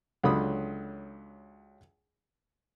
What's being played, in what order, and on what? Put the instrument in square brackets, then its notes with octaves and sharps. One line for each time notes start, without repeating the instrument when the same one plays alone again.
[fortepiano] C#2 D3 F#3 B5 D#6